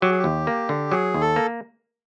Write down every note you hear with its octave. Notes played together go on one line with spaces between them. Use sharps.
F#3 G4
G#4
G4
D#2
A#3
D3
F#3 G#4
D#2
A4
A#3